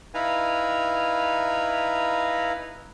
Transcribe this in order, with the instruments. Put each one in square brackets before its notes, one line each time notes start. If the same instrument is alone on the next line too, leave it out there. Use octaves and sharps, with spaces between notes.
[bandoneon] D#4 E4 B4 F5 G#5 A#5